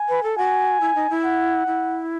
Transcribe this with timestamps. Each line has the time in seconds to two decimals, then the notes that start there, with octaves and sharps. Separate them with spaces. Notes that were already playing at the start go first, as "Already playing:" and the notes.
Already playing: G#5
0.09 B4
0.23 A4
0.37 F#4 G#5
0.81 E4
0.95 D#4
1.10 E4
1.24 F#5
1.67 E4